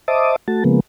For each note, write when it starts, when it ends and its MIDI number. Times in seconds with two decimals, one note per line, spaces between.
0.08 0.36 72
0.08 0.36 75
0.08 0.36 76
0.08 0.36 81
0.08 0.36 86
0.08 0.36 87
0.48 0.64 57
0.48 0.64 66
0.48 0.64 81
0.64 0.80 49
0.64 0.80 53
0.64 0.80 56
0.64 0.80 58
0.64 0.80 59